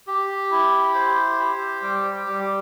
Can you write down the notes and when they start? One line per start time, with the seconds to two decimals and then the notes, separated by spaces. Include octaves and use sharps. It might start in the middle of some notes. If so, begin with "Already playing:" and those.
0.07 G4
0.51 E4
0.95 C5
1.39 G4
1.82 G3
2.27 G3